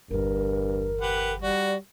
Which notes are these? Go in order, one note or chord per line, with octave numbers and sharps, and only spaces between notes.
G1 E2 G2 A#4
G4 B4 F#5
G3 F#4 D5